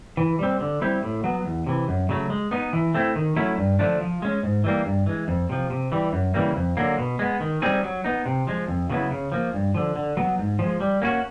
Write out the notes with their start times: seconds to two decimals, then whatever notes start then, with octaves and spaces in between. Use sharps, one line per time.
0.17 E3
0.39 G3 C4
0.61 D3
0.81 G3 C4 E4 G4
1.03 A2
1.24 F#3 B3
1.45 E2
1.67 C3 E3
1.88 F#2
2.09 C#3 F#3 A3
2.30 G#3
2.51 B3 D#4
2.73 E3
2.94 A3 C4 E4
3.16 D#3
3.36 F#3 A3 C#4 E4
3.58 G2
3.79 D3 F3 A3 D4
4.01 F3
4.22 G#3 C#4
4.43 G#2
4.64 E3 G3 A#3
4.85 G2
5.06 E3 G#3
5.28 F2
5.49 C3 F3
5.70 C3
5.92 E3 G3
6.13 F#2
6.34 C#3 E3 G3 A#3
6.56 F2
6.77 D3 F#3 A#3
6.98 B2
7.19 G#3 B3
7.40 D#3
7.62 G3 C4 D#4 G#4
7.83 F#3
8.04 B3 D#4
8.26 C3
8.47 F3 G#3
8.68 F2
8.90 C#3 F#3 B3 E4
9.11 C#3
9.32 F3 A#3
9.53 G2
9.74 D3 F3
9.96 D3
10.17 F#3 B3
10.38 G#2
10.59 F3 G#3
10.80 G3
11.02 A#3 C#4 F#4